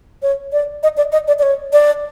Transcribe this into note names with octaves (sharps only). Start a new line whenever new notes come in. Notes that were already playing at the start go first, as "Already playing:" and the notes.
C#5
D5
D#5
D5
D#5
D5
D5
C#5
D5